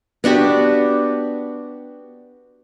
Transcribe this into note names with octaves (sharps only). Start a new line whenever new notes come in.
B3 D4 F#4 G4